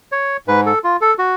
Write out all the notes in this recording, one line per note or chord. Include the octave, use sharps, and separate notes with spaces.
C#5
G#2 B4
A4
F4
A4
F#4